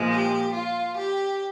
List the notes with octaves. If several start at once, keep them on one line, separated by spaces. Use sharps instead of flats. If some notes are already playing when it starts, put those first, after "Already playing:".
Already playing: A#2 F3 G#3
G4
F4
G4